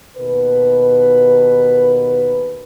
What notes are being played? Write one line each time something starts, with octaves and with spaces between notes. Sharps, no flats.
D#2 B2 A#4 B4